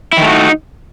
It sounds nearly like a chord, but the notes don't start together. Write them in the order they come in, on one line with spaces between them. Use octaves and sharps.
E4 D#3 A3 F#4 D#4